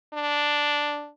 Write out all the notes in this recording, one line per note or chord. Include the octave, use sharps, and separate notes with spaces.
D4